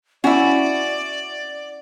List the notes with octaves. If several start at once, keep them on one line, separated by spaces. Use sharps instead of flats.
C#4 E4 F#4 D5